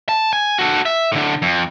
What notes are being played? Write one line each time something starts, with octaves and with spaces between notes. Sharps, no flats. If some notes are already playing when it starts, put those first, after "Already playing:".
A5
G#5
F#4 A4
E5
A2 D3
F2